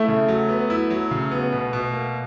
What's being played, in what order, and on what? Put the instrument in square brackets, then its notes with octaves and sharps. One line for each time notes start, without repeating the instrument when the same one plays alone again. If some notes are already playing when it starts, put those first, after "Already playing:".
Already playing: [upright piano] A3 [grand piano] E4
[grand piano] C#3
F#3
B3
E4
F#3
C#3
B3
B2
B2
A#3